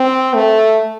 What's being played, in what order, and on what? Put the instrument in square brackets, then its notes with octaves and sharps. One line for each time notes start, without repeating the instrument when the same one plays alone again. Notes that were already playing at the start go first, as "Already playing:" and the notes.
Already playing: [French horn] C4
A3